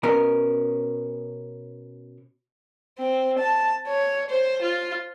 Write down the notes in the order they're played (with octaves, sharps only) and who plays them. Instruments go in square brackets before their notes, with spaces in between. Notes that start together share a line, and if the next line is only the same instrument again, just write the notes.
[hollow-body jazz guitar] B2 B3 C#4 A#4
[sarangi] C4
A5
C#5
C5
F4